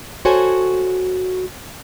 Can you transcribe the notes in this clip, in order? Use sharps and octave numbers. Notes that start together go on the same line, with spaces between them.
F#4 A4 C5 C#5 G#5